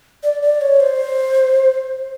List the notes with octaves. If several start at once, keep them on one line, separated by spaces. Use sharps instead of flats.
D5
D5
C#5
C5